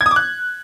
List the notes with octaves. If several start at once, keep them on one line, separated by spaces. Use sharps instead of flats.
G#6
D#6
D6
F#6